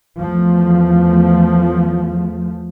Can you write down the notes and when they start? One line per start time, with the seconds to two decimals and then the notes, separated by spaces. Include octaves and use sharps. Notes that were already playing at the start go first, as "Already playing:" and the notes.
0.18 E2 F3 A3